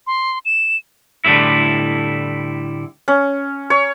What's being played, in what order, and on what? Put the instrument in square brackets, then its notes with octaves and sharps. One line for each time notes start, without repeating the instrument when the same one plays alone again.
[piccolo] C6
E7
[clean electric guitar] A2 D3 G3 A3 E4
[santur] C#4
C#5